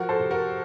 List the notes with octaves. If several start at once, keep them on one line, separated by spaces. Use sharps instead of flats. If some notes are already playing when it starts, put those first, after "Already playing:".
Already playing: F3 F#4 A#4
A4 C5
C3
F#4 A#4